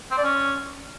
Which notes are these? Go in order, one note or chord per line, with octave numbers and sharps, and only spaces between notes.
C4
D5
C#4